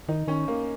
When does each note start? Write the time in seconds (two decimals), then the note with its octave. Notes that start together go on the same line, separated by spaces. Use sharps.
0.09 D#3 D#4
0.27 D#3 C#4
0.48 A#3